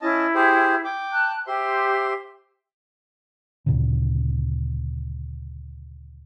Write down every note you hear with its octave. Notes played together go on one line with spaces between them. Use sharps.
C#4 E4 D#5 A5
G4 G#4 C5
G5 D6
A5 F#6
G4 C5 E5 C6
D2 A#2 C#3